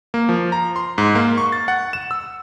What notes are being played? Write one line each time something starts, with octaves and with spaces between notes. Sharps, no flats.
A#3
F3
A#5
C6
G#2
A#3
C#6
A6
F#5
E7
E6